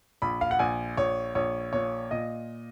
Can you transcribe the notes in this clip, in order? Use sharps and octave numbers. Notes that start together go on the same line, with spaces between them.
A#1 B5
F5
F#5
A#1 G#5
A#1 C#5
A#1 C#5
A#2 C#5
A#2 D#5